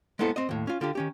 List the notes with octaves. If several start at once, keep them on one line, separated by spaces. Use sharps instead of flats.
G#3 A#3 B3 E4 A4 C5
C4 D#5
D#2 A2
C#4 F4
D3 F4 G4
D#3 C#4 G4